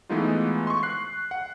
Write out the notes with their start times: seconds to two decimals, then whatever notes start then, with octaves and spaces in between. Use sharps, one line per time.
0.09 E3 G#3 A3 B3 D#4 F4
0.67 C6 C#6
0.83 F#6 C7
1.31 F#5